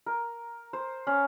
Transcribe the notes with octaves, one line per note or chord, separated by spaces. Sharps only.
A#4
C5
C#4